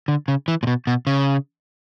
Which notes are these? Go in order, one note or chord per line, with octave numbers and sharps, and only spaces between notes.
D3
C#3
E3
A#2
B2
B2
C#3